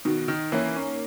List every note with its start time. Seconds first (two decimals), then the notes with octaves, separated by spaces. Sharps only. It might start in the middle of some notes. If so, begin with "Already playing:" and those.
0.05 B2 D#3
0.28 D#3
0.52 E3 A#3 C#4
0.76 C#4